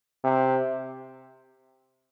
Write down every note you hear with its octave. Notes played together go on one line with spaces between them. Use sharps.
C3